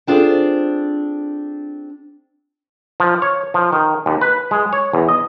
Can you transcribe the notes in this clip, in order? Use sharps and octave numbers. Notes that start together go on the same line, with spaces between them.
C4 D4 F4 G#4 A4 C5
F3
C#5
F3
D#3
D#2
B4
G#3
C#5
E2
D#5